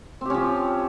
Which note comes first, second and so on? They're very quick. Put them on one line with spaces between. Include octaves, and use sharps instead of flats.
C4 G4 C#4 F3